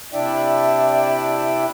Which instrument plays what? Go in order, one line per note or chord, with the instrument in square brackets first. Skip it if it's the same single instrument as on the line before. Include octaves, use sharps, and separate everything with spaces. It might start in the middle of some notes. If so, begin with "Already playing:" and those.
[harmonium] C3 D4 E4 D5 E5 G5